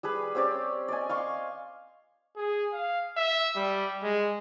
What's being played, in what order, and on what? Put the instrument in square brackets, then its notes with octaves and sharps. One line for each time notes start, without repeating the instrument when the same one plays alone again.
[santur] G3 G#4 B4
C4 C#4 G4 D5
D5 D#5 G#5
F5 C6 C#6
[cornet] G#4
F5
E5
G3
G#3